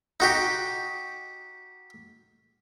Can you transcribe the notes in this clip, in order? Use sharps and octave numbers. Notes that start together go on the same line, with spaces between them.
D#4 F#4 G4